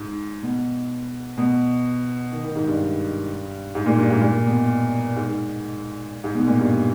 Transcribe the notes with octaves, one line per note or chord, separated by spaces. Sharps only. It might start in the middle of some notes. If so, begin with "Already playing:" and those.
Already playing: G#2
B2
B2
D#3
D#3
G#2
G2
G#2
A#2
G2
G#2
A#2
B2
G#2
G#2
B2
A#2
G2